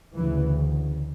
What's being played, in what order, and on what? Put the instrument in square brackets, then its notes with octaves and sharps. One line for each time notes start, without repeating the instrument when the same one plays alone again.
[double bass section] D2 C#3 E3